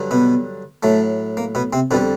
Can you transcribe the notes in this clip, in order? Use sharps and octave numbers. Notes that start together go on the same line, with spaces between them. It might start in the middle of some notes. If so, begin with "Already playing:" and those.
Already playing: G2 D3 F#3
B2 B3
A2 F#3 A3
A#3
B2 B3
C3 C4
F2 B2 D3 G3 B3